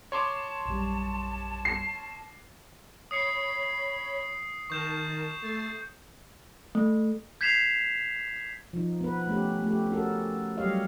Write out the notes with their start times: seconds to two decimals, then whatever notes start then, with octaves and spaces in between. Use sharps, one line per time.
0.12 C#5 A5 C6 D6
0.66 A#1 F#2 G3
1.65 C7
3.11 C#5 B5 D#6 C7 C#7
4.70 D#3 A#4 A5 C#6 G6 E7
5.42 A3 A6 C7
6.75 A3
7.41 G6 G#6 B6 C7 E7 F7
8.73 F3 D#4
9.01 B3 B4
9.27 A3 C#4 G4
9.64 A3 G4
9.91 C#4 F#4 A4 A#4
10.57 F#3 G3 G4 C#5 D#5 F5